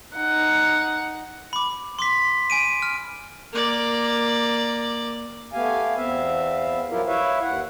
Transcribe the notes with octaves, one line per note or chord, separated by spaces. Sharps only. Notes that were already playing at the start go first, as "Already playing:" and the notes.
D#4 F#5
B5 D6
C6 D6 B6
G#5 D7 D#7
F6
A#3 D5
A3 B3 G4 F5 G#5
E2 B3 C4 E5 F5
F3 F#3 E4 F4 G4 A#4
E4 B4 C#5 E5 F5
D#2 F#5